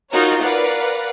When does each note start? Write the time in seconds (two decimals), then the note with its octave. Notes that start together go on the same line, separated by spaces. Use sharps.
0.12 D#4 F4 F#4 A#4 C#5
0.42 A#4 B4 D5 F5 F#5